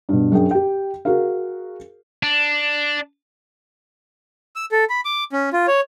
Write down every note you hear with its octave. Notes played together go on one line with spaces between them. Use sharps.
G2 B2
F#2 D4 G#4 G5
G4 G5
F#4 G#4 A#4 F5
D4
E6
A4
B5
D6
C#4
F4
C#5